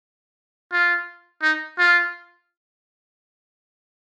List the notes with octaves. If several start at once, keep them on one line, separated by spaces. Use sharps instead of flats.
F4
D#4
F4